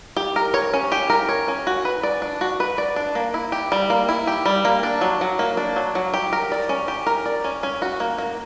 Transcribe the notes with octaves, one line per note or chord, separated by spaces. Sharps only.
G4
A#4
C#5
C#4
G4
A#4
C#5
C#4
F#4
B4
D5
D4
F#4
B4
D5
D4
A#3
E4
G4
G3
A#3
E4
G4
G3
A#3
D4
F#3
F#3
A#3
D4
F#3
F#3
G4
A#4
D5
C#4
G4
A#4
D5
C#4
C#4
F#4
A#3
A#3